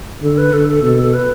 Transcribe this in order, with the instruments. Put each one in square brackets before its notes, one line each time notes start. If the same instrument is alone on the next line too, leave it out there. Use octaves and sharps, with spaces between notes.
[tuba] D3 [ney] A4
[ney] B4
[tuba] D3 [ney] A4
[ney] A4
[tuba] B2 [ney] A4
[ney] A4
B4